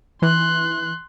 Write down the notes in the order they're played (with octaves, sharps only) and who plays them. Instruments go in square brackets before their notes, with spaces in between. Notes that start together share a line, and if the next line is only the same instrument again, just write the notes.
[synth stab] E3 [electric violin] C6 F#6